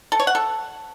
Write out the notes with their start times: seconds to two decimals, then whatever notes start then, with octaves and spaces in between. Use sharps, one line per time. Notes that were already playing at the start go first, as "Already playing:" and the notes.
0.12 A4
0.20 C#5
0.27 F#5
0.35 A4